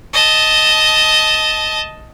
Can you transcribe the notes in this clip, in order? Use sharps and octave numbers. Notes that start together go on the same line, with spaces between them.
D#5 A5